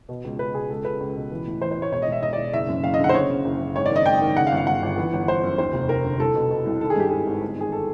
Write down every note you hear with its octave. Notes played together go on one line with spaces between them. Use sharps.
B2
C#2
C#2 B4
B2 G#4
C#2 A4
C#2 B4
C#2
B2
E3
A2
E3 C5
C5
A1 C#5
E1 C#5
D#5
E1 E5
E1 D#5
E1 D5
F#1 E5
F#2
F#1 F5
D#5
D3
F#5
C5
C#3 C#5
C#3
F#1
F#1
G#1 C#5
D#3 D5
D#5
G#1 G5
D#3
C#3 F#5
F5
G1
F5
G1 F#5
G1
E3
G1
G1 C5
F#2
D#2 C5
F1
F1 A#4
D3
C2 A4
B2
B2
C2
D#3 A4
G#4
G2 G4
G#1 G#4
G#1
G1
D#3 G#4
A4